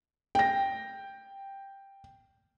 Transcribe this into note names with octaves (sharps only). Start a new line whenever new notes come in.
G5 A#6